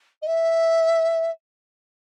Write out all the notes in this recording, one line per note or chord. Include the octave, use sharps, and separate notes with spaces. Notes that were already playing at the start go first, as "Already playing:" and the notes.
D#5
E5